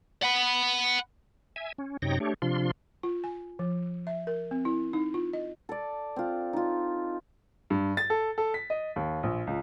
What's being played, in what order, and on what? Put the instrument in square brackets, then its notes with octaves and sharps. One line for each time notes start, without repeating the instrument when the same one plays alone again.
[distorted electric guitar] F#5 B5
[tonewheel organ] E5 G#5
C#4
F#2 C3 D#4 C#5 G5 A#6
A3 D4 G4 C#5
C3 F3 D4 F4 C6
[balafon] F4
G#5
F3
E5
A#4
C4
E4
D#4
F4
D#5
[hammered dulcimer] A4 D5
C4 F4
D#4 F4
[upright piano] G2
A6
A4
A4
B6
D#5
D#2
A#1
C#2